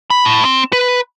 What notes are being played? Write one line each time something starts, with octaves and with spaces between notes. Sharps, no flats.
B5
A2
C4
B4